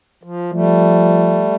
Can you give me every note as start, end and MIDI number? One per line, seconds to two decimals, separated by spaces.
0.23 0.51 53
0.52 1.53 53
0.52 1.55 55
0.52 1.55 57